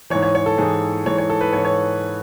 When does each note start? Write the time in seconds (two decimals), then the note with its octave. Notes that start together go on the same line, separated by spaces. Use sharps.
0.10 E3 C#5
0.15 G#2
0.22 C#5
0.35 C#5
0.46 A4
0.58 G#2 E3 G#4
1.06 G#2 E3 C#5
1.18 C#5
1.30 A4
1.41 B4
1.53 G#2 E3 C#5
1.65 C#5